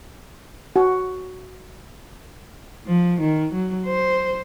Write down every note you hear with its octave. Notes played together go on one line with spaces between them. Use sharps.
F#4
F3
D#3
F#3
C5